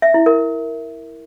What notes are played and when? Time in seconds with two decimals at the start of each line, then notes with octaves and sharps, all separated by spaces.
0.02 E5
0.14 E4
0.26 A#4